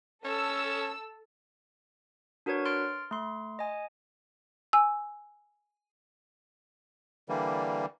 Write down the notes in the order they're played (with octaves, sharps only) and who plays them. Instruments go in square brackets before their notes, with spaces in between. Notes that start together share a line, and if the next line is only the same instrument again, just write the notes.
[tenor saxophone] C#4 [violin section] A4 E6
[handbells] D4 F#4 A#4 B4 C#5 G#6
C6 F6 A6 D7
A3 C6
D#5 G#5
[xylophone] G#5 E6
[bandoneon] D3 E3 G3 A#3